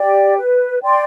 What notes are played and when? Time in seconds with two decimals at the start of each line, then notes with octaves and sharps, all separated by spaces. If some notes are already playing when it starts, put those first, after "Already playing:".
Already playing: G4 D5 G5
0.38 B4
0.83 D5 G5 C6